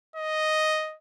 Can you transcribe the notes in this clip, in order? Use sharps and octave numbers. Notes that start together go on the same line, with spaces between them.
D#5